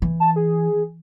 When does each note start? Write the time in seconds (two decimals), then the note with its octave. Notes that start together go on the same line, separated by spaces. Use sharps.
0.02 E3
0.20 A5
0.36 G#4